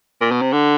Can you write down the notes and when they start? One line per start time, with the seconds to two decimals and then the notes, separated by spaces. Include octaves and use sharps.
0.21 A#2
0.31 B2
0.42 C3
0.53 D3